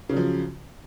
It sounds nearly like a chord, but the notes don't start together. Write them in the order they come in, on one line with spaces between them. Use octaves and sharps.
C#3 F#3 F3